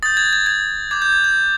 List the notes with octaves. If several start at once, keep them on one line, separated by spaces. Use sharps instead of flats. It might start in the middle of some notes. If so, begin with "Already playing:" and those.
D#6 G6 A6
G#6
G#6
G#6
D6 G6 G#6
G6
G#6
G6